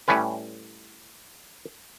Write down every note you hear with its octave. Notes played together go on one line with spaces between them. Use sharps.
A2 G3 A3 C#4 B4